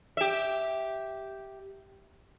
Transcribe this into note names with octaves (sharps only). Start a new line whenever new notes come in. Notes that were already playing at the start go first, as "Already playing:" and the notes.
G4 E5